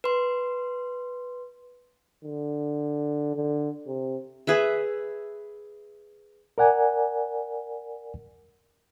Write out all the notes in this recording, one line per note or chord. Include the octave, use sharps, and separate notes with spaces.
B4 C6
D3
D3
C3
G#4 B4 E5
A#4 D5 F#5 G#5